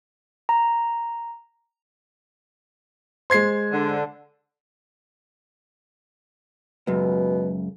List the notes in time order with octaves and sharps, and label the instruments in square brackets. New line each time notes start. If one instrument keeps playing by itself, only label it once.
[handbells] A#5
[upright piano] G#3 C5 [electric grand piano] C6 G#6 C7
[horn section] D3
[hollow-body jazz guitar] C#2 F#2 [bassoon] B2